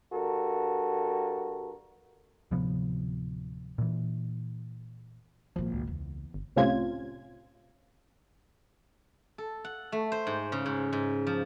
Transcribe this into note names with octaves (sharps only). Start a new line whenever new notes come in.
G2 F#4 A4 A#4
D1 C3 F3 B3
A#2 E3
G#1 A#2 F3
C#2
E2
G1
C2 A2 C3 C#4 F4 G#6
A4
F#5
A3
C5
G#2
C#3
G#2
G#2
F3